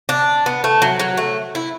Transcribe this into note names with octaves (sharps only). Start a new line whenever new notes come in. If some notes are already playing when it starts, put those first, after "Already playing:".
D4
B3
A3
F#3
F#3
A3
E4